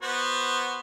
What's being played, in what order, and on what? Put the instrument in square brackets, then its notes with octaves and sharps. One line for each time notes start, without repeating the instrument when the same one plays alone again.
[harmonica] B3 F#4 C5